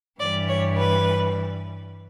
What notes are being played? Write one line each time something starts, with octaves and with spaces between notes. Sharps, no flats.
G2 E3 G3 D5
C#5
B4